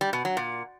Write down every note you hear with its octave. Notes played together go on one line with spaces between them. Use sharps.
G3
B2
F#3
A#2